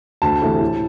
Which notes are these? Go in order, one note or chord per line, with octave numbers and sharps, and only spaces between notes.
D2 A5
C3 E3 A3
A2